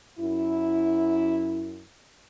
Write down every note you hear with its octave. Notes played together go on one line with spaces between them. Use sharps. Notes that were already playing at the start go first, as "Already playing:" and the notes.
F#2 E4